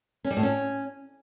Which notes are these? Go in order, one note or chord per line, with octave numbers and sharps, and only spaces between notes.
C#4
G3
A2
C#4